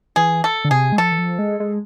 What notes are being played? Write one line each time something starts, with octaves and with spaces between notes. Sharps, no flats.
E3 G#4
A4
D3
C3 G#4
G#3
F3 A4
E3
F3
G#3
G#3